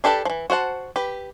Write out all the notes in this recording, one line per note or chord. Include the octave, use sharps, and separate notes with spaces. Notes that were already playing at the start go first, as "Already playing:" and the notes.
D4 G4 A4 B4 A5
E3 F3
F#4 C5 F#5 A5
G4 B4